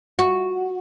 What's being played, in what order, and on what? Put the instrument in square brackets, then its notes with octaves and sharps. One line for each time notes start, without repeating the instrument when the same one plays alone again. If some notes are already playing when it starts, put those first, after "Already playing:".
[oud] F#4